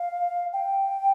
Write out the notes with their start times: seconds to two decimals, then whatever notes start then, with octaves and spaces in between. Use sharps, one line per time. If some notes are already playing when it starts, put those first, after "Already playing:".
Already playing: F5
0.53 G5